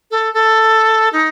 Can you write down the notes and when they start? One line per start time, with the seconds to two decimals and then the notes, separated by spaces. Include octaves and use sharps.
0.11 A4
0.34 A4
1.13 D#4